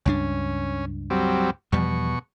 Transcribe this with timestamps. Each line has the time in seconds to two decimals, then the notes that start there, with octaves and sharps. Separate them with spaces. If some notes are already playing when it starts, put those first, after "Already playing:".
0.06 C#2 G2 C#4 D4
1.10 F#3 G3 C4
1.72 E2 B2 F3 G3 C#6